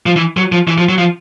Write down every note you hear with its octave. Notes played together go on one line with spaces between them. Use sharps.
F3
E3
F#3
F3
E3
F3
F#3
F3